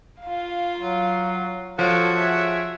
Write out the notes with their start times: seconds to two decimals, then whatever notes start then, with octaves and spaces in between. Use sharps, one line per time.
0.22 F4 F5
0.80 F#3
1.79 F3 F4 F#4 A4 C#5
2.15 G#4 E5